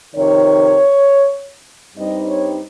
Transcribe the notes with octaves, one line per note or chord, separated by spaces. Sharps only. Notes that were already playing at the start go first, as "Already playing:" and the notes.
F2 C3 D#3 C#5
G2 G3 C4 D#4 D#5
C#5